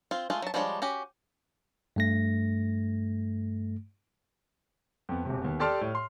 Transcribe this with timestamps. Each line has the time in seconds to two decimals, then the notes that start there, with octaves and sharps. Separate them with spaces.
0.11 C4 F4
0.30 G#3 A3 F4
0.42 F#3 A5
0.54 F3 G3 G#3 D4 C#5
0.82 C#4 F#4 G4
1.96 G2 A3 A#6
5.09 F2 B3
5.25 E1 C3
5.41 D#2 B3
5.60 G4 A4 D5 A5 C6 F6
5.81 A2
5.95 C6